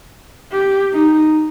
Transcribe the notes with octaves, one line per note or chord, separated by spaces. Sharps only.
G4
D#4